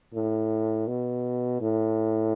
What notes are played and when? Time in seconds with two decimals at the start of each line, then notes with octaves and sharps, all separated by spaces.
0.14 A2
0.87 B2
1.61 A2